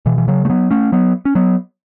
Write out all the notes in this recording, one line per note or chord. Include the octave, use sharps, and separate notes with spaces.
B2 E3
E3
C#3 F#3
A3
F#3 B3
A3 C#4
F#3 B3
C#4
F#3 B3